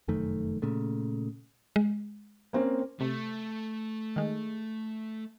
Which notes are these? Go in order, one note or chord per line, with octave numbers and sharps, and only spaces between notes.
F1 F#2 D#3 A3
A#2 C#3 A3
G#3
A#3 C4 C#4
C3 A3
D#3 G#3